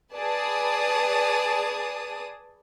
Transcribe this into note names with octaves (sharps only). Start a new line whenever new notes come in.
G#4 B4 D5 A5 D#6